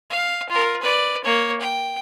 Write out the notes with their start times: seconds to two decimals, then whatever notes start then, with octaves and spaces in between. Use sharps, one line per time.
0.10 F5
0.50 F4 A#4
0.82 B4 D5
1.24 A#3 C#5
1.61 G5